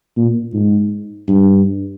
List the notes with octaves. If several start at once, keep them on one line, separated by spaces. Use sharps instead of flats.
A#2
G#2
G2